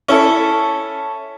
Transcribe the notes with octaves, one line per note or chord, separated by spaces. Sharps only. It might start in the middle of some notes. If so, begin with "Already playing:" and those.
C#4 E4 A4